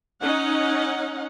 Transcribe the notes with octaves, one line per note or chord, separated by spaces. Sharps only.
C#4 D#4 F#5